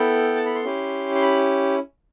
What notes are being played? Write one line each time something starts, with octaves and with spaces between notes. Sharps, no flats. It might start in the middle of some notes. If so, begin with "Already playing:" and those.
Already playing: B3 E4 A4 G5
A5
B5
C6
C#4 E4 G4
C6
B5